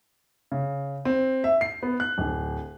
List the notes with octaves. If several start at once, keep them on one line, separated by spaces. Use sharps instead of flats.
C#3
C4
E5
C7
B3
F#6
D1